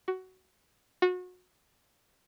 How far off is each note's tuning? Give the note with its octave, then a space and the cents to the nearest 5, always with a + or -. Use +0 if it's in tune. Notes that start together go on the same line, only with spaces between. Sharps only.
F#4 +15
F#4 -30